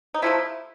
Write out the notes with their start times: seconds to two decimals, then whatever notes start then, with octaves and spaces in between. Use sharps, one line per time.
0.14 D#4
0.22 C3 F3 A3 E4